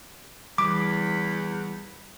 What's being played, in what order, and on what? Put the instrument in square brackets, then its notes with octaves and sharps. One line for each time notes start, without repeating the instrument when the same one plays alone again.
[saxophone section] E2 [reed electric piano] E3 G3 [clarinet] B5 [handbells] D6